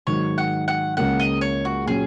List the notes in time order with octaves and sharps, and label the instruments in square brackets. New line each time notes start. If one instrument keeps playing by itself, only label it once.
[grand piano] G#2 D#3 F#3 [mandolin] C#5
[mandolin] F#5
F#5
[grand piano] C#2 C#3 A#3 C#4 [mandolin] F#5
[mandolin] D#5
C#5
F#4
[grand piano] A#2 F#3 C#4 [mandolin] G#4